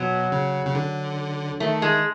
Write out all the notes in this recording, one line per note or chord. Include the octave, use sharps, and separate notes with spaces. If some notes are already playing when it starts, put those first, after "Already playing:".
Already playing: B2 F#3
C#3
C#3
D3
D#3 A3
G#3